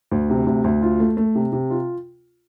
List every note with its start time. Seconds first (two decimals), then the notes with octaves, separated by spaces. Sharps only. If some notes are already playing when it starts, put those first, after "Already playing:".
0.11 D2
0.30 C3
0.46 D2
0.64 D2
0.82 F4
1.00 A3
1.17 A3
1.35 C3
1.52 C3
1.70 F4